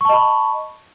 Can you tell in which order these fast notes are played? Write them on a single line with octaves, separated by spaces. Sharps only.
C#6 A5 D#5 B5